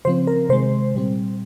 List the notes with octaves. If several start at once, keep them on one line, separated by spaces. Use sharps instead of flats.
C#3 F3 C4 C5
A#4
C3 D#3 G#3 C5
A#2 G3 C4